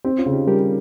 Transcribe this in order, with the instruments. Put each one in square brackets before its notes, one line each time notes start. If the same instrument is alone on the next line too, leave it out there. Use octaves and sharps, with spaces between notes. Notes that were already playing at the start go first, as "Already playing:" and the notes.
[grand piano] C4 [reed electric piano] D#4 G4
[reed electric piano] C#4 F4
[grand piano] C#3
[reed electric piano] D#4 G4
[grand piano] G3 [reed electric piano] G4 A#4